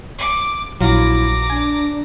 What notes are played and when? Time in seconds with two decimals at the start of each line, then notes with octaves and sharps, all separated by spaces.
0.18 D6
0.81 A#1 F#3 E4 F4 A#5 D6
1.50 D4 G#5